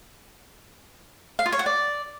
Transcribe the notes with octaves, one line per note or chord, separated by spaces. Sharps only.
F5
F4
C#5
F#5
D5